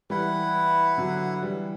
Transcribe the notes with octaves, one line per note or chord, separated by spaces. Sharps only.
E3 G3 E4 B4 F#5
D3 F#3
E3 G3